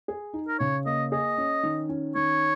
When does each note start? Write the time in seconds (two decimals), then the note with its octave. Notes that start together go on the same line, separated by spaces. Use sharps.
0.08 G#4
0.33 D#4
0.48 A#4
0.59 C#3 C#5
0.85 A#3 D#5
1.12 G#4 D#5
1.38 C#4
1.63 D#3
1.89 C#4
2.15 D#3 C#5